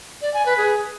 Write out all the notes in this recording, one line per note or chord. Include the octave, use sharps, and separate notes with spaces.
D5
G#5
B4
G#4